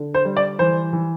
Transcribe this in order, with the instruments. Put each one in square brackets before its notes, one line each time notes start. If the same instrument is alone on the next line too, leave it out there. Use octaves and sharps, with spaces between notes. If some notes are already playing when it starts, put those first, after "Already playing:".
Already playing: [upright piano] D3
C5
G3
D5
E3 C5
E3